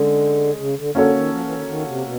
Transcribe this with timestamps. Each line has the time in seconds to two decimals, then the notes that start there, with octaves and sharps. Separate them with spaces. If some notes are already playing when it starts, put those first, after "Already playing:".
Already playing: D3 G#3 C#4
0.58 C#3
0.77 D3
0.95 D3 A#3 C#4 F#4 A4 C#5
1.14 D#3
1.31 F3
1.43 E3
1.56 D#3
1.67 D#3
1.86 C3
2.04 B2